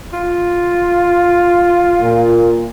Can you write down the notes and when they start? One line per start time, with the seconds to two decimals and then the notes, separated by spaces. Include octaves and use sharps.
0.13 F4
2.01 A#2